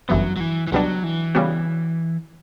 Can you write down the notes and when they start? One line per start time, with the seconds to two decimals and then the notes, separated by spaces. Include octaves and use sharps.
0.09 G1 F#2 E3 F#3 B3
0.37 F#3
0.40 E3
0.67 E3
0.72 C#2 B2 F#3 G3 D4
1.04 E3
1.35 C#3 G3 B3 F#4